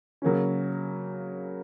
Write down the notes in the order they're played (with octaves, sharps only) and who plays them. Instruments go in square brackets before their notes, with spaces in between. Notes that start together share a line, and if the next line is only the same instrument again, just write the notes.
[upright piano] C#3 F#3 A#3 C#4